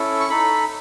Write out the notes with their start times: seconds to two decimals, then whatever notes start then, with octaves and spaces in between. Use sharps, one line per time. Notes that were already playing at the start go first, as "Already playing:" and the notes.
Already playing: C#4 E4 A4
0.20 C#6
0.30 D#4 A4 B5